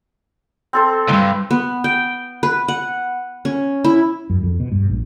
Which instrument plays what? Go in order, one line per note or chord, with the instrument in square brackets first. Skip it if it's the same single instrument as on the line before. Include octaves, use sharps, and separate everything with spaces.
[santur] C4 A4 C5
[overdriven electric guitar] C#2 G2
[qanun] B3
G5
B4
F#5
C#4
E4
[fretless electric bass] F#2
F2
B2
G2
A#1